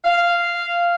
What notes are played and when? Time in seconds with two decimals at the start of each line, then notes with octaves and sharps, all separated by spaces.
0.05 F5